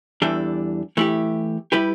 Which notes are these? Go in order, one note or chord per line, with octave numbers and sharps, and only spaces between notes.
E2 E3 G3 D4 A4
E3 A3 E4 G4
G3 E4 G4 B4